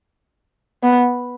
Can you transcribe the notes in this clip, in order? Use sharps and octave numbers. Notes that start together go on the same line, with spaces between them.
B3